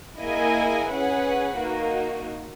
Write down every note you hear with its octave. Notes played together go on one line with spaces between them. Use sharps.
A#3 E4 G#4 D#5 G#5
C#4 G#4 B4 F#5
A#3 D#4 F#4